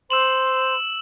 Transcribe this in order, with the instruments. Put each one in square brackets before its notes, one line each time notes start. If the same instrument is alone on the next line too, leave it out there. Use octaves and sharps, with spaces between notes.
[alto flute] C5 [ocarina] C6 [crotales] E6 E7 F#7